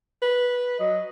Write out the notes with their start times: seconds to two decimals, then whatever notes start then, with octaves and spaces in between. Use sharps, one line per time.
0.22 B4
0.80 F#3 D#5